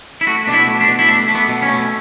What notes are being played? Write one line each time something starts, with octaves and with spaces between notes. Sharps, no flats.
E4
A3 F#4
B2 D4
E4
A3
D4
B2
E4
A3 D4
A3
B3
B2
C#4
A3